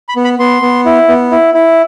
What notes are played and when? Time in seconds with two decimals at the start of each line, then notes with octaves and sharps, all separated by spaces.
0.09 B5
0.16 B3
0.24 B5
0.39 B3 C6
0.62 B3
0.85 E4
1.08 B3
1.31 E4
1.54 E4